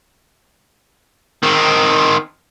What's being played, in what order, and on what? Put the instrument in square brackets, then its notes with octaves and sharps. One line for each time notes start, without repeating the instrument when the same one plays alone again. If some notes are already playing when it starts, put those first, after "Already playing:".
[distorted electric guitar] D#3 C4